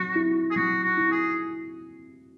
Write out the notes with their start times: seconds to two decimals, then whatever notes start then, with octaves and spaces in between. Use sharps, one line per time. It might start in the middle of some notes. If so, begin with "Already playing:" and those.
Already playing: F#3 F#4
0.15 E4
0.51 G#4
0.56 F#3 F#4
0.84 F#4
0.97 E4
1.11 G#4